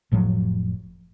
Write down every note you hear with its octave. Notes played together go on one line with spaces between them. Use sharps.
F1 A2 F3 F#3